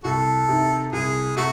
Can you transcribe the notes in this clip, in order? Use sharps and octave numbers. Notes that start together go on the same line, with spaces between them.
C2 F#4 A4
C3 D#3
C2 G#4
C3 A3 F#4